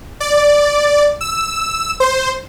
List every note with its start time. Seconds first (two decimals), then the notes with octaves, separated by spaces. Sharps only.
0.20 D5
1.21 E6
2.00 C5